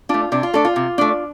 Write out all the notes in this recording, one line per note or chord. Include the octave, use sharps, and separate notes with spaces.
A3 D4 F4
C3 D4
F4
A3 D4 A4
F4
C3
A3 D4